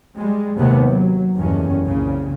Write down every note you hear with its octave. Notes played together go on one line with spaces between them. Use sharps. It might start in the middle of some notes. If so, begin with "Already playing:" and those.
G3 G#3
D#2 C3 G#3 B3
F#3
F#1 E2 G2 D#3 C#4
C2 A#2 C#3